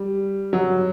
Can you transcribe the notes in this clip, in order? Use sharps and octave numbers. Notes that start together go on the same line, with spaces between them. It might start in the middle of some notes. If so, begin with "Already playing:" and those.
Already playing: G3
F#3